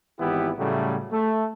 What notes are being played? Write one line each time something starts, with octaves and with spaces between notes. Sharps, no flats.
G#1 E3 B3 E4 G4
A2 C#3 F#3 G3 A3
A3